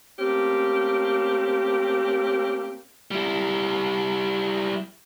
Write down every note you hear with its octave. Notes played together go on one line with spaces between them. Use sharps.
A3 A#3 C4 C#4 G4
G3 E4